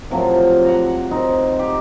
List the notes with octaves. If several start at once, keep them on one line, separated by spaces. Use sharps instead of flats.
A2 C3 F3 F#3
F#5 A#5
C4 D#4
G4